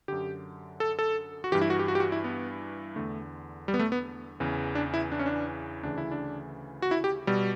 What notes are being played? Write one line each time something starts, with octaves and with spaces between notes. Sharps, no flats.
F#2 D3 G4
A4
A4
F#4
G2 E3 G4
E4
F#4
G4
F#4
G4
F#4
E4
B3
E2 D3 A3
G3
B3
A3
B3
E2 C#3 E3
D4
E4
D4
C#4
D4
D2 C#3 E3 D4
E4
D4
F#4
E4
G4
B2 G3